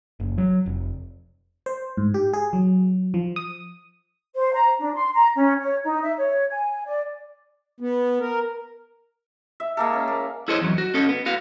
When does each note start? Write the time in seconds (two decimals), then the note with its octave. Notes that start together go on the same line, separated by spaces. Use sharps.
0.20 F#1
0.38 F#3
0.66 F1
1.66 C5
1.97 G#2
2.14 G4
2.33 G#4
2.53 F#3
3.14 F3
3.36 D#6
4.35 C5
4.54 A#5
4.80 D4
4.95 C6
5.15 A#5
5.36 C#4
5.62 C#5
5.84 D#4
6.03 E5
6.18 C#5
6.51 G#5
6.86 D5
7.80 B3
8.20 A#4
9.60 E5
9.77 G#3 A#3 A4
9.93 C#4
10.08 A#3
10.48 E4 G#4 A4 C5 C#5 D#5
10.62 E2 F#3
10.78 F#4
10.94 C#4 A4 D#5
11.09 B3
11.26 B3 F#4 F5